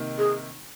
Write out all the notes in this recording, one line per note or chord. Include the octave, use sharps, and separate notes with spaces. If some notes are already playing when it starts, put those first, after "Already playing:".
Already playing: C3 D#3 A#3 D#4
G#4